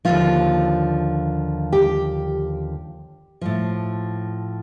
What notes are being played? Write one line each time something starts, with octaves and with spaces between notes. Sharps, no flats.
D#2 D3 F3 F4
G4
A2 F3